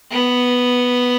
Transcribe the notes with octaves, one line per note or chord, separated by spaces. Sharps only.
B3